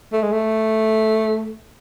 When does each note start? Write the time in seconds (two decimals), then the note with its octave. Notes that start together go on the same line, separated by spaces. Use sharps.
0.13 A3
0.23 G#3
0.32 A3